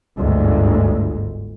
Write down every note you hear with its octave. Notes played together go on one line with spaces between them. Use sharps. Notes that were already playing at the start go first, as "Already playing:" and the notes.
G1 D2 G#2